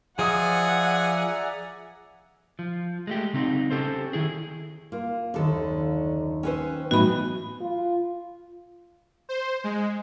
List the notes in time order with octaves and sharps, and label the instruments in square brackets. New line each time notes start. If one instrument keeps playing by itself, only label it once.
[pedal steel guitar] F3 D#6 [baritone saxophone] G#4 [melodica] D5 E5 A#5 [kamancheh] F#5
[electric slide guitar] F3
G#3 A3 G4
C#3 C4 D#4
C#4 G4 A4 C5
D#3 E4 G#4
[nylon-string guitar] A#3 [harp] F4
[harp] F#1 D#2 D#3 [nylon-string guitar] D3 A4
[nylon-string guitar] C#4 B4 C5 [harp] G5 E6
[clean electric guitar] A2 B3 D#4 [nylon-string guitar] E3 F#3 [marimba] F#4 B5
[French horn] F4
[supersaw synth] C5
G#3